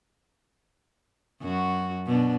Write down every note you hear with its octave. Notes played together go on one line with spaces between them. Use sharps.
F#2 F#4
B2 D4